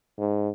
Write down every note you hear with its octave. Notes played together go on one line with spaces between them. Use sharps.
G#2